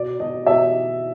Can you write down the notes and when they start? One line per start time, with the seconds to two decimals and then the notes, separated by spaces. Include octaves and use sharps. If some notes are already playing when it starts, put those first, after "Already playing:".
Already playing: B2 D5
0.19 B2 D#5
0.46 B2 E5